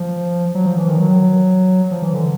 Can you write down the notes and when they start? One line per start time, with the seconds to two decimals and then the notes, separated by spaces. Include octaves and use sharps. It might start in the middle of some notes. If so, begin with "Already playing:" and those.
Already playing: F3
0.55 F#3
0.66 F3
0.78 E3
0.88 D#3
0.99 F#3
1.91 F3
2.02 E3
2.13 D3